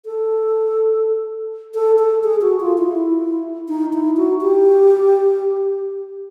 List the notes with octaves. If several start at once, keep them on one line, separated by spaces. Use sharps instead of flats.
A4
A4
A4
G#4
F#4
F4
E4
D#4
E4
F#4
G4